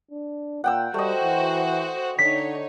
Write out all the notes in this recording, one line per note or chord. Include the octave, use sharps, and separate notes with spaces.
D4
A#2 F#5 G5 E6
G3 A3 F#4 C5 D#5
E3
D3 D#4 C#5 B6